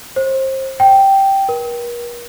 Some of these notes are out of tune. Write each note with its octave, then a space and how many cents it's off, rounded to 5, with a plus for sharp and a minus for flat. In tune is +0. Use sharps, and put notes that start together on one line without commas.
C5 +30
G5 -5
A#4 +40